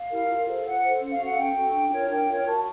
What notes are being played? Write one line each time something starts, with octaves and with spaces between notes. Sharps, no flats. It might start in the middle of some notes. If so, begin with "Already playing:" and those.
Already playing: F5
E4 G4 A#4
F4
A4 C5
F4 F#5
A4 C5
C#4
F5
F#4 A4
F#5
C#4 G5
F#4 A4
D4
F4 A#4 C#5
D4 G5
F4 A#4 C#5
F#4 A5